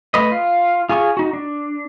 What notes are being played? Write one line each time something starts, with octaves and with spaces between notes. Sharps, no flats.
A3 B4 D#5
F4
F4 G#4 G#5 C#6
D#4 F#4
D4